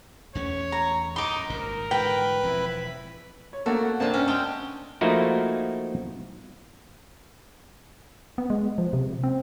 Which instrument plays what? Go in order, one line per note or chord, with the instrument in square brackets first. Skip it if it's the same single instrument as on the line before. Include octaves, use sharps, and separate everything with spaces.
[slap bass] E2 A3 C#4 [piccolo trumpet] C#5
[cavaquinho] A#5
[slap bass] F#2 A2 [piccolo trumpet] D#4 [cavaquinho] C6 D6
[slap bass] G#1 G2 A#2 [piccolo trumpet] A#4
[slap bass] G#2 D3 E3 [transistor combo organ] B4 [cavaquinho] G5
[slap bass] E1 F3 C4 [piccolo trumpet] E4
[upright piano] C#5
[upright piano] A3 A#3 A4 [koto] F#4
[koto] C3 A5 [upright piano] A#3 C4 D4
[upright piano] F#2 D4 [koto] C#4
[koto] G#3 C4 G5 [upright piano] A5
[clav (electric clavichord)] F3 A3 A#3 D#4 E4 F#4
[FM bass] B3
G#3
F3
C3
C4